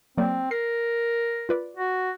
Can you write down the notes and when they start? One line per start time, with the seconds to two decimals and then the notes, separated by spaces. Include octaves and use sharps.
0.17 F#3 A#3 C4 D5
0.51 A#4 C7
1.49 F4 B4 D5
1.77 F#4